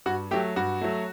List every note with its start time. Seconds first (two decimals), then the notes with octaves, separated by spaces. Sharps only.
0.06 G2 F#4
0.31 F#3 A3 G4
0.56 G2 F#4
0.81 F#3 A3